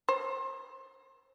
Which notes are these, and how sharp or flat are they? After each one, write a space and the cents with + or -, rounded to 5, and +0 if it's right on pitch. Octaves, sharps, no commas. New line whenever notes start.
C5 +35